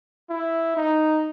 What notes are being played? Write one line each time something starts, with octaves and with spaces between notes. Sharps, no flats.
E4
D#4